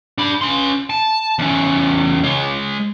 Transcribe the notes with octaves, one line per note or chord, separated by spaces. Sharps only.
D4 B5
C#4 C6
A5
E2 C#4
G#3 C#5